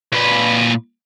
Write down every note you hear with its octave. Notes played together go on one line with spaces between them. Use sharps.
A#2 B4